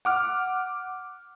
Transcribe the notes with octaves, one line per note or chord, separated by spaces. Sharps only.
F#5 D6 F6